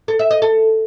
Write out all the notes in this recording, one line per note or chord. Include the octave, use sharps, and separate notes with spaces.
A4
E5
D#5
A4